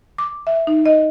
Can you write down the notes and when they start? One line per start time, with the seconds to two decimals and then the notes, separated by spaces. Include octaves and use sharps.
0.18 D6
0.47 E5
0.67 D#4
0.86 D#5